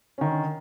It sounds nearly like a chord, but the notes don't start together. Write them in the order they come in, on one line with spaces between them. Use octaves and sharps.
C#4 D#3 D3